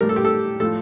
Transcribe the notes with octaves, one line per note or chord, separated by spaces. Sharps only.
A2 G3 A#4
A4
G4
A4
A2 F3 A4